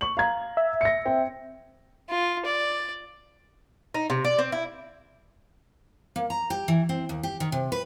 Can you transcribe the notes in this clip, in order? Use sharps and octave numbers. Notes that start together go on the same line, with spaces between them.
C#6 F#7
F5 A#5 G#6
E5
A#6 C#7
C4 G5
F4
D5
D#4
C3
D5
C4
E4
A#3
A#5
G4
E3
C4
D#2
G4
D#3
C3
B4